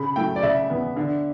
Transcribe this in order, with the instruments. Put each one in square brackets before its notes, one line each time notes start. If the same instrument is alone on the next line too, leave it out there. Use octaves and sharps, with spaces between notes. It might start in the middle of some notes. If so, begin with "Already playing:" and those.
Already playing: [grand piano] C#3 B5
F#3 A3 E4 G5
D5
C#3 E5
E3 B3
D3